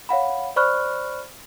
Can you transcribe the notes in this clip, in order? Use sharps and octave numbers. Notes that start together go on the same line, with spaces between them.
C#5 F5 F#5 B5
C5 D5 B5 C#6 F6 F#6